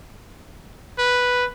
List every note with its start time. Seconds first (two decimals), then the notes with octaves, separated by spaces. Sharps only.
0.98 B4